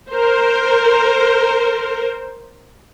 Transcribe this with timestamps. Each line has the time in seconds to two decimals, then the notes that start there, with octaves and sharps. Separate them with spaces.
0.11 A#4 C5